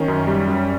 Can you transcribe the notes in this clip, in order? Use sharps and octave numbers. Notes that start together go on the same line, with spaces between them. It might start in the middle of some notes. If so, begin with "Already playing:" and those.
Already playing: D#3 C#4
F#2
G3
F#2